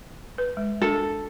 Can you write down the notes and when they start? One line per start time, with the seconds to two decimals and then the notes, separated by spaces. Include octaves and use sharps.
0.38 B4
0.57 G#3
0.82 D4 A4 A#4